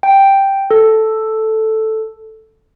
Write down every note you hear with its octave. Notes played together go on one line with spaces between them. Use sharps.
G5
A4